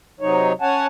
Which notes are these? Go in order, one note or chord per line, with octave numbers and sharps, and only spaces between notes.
C3 F#3 D#4 C#5
C#4 C#5 F#5 G#5 A5